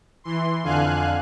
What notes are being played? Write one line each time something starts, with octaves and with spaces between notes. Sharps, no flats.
E3 C6
F2 D3 F5 G#5 F#6